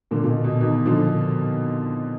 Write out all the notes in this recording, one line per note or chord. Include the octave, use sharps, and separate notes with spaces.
A#2 D3
A#2
B2
B2
B2 D#3
D3 F3